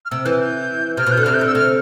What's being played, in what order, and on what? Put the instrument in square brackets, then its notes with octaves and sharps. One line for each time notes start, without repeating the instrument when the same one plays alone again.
[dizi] F6
[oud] C3 [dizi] E6
[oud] E3 [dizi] G6
[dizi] G6
[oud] C3 [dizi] F6
[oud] B2
[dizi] G6
[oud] D3
[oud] C3 [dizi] F6
[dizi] G6
[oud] D3
[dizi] E6
[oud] C3 [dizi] F6